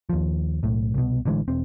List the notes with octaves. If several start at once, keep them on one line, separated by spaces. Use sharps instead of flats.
D#2 F3
B1 A2
C2 B2
A1 D3 E3 G#3
E1 C4